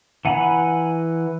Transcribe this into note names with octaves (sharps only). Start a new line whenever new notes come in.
E3 F#5 G#5 A#5 B5